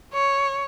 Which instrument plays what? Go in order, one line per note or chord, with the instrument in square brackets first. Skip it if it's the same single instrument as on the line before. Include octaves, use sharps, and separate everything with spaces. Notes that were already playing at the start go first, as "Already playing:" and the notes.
[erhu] C#5